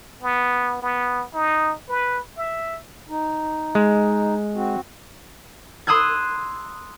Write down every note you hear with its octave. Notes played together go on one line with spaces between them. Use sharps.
B3
B3
D#4
B4
E5
D#4
G#3
C4 F#4
C6 D#6 E6 F#6 G#6